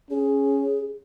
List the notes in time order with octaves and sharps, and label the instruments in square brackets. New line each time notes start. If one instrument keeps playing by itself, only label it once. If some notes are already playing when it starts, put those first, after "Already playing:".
[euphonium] C#4 [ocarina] G#4